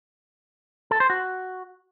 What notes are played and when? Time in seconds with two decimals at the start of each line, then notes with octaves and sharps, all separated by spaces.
0.91 A4
1.00 C5
1.10 F#4